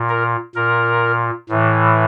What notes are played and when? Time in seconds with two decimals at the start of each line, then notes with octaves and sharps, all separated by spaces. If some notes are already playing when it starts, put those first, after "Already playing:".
Already playing: A#2
0.09 A#4
0.55 A#2 A#4
1.49 A2 E3